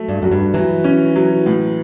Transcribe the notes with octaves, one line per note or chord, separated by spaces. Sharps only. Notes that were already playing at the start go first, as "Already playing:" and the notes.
Already playing: F#3 A3
G2
F#2 F#4
G2
E3 F#3
C#4
F#3
A2